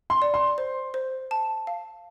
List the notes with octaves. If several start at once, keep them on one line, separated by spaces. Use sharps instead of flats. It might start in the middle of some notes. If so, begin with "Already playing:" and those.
C6
D5
C6
C5
C5
A5
F5